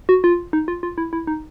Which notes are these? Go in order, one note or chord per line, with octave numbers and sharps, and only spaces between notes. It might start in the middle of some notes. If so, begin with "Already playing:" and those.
F#4
F4
D#4
F4
F4
E4
E4
D#4